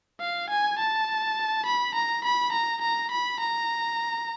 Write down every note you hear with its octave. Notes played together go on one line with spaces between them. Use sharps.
F5
G#5
A5
B5
A#5
B5
A#5
A#5
B5
A#5